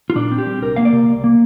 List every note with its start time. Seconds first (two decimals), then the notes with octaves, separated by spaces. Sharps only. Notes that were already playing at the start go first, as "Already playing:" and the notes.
0.10 F4
0.16 A#2 D4
0.31 C4
0.38 G4
0.47 G3
0.62 C2 A#4
0.76 A#3 F5
0.85 D5
0.93 C3
1.09 C2
1.24 A#3